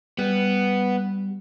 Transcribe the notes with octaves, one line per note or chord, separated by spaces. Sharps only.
G3 B3